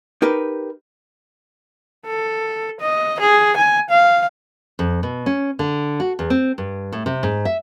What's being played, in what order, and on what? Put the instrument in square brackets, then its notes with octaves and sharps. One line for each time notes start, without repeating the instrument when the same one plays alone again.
[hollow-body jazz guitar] D#4 G4 A#4 B4
[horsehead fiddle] A4
D#5
G#4
G#5
F5
[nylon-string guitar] F2
B2
C#4
D3
F#4
E2
C4
G2
A2
C3
G#2
E5